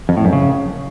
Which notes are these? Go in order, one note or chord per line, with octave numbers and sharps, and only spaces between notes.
F2
A2
F#2
C#3